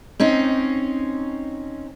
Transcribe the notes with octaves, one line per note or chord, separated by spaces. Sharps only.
C4 C#4 D#4